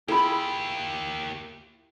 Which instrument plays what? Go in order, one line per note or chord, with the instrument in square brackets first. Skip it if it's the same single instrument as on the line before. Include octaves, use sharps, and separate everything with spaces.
[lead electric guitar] A#3 G4 [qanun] E4 F4 [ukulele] G#4 A#5 B5